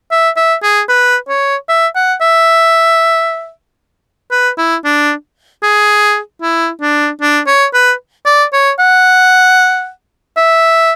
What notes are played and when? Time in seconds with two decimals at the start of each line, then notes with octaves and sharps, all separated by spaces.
0.11 E5
0.36 E5
0.63 G#4
0.89 B4
1.28 C#5
1.69 E5
1.95 F#5
2.21 E5
4.31 B4
4.57 E4
4.84 D4
5.63 G#4
6.42 E4
6.81 D4
7.21 D4
7.47 C#5
7.74 B4
8.26 D5
8.53 C#5
8.79 F#5
10.37 E5